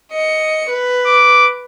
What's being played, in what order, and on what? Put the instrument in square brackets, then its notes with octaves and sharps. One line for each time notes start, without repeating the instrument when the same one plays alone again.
[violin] D#5 C#7
B4
[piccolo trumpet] D6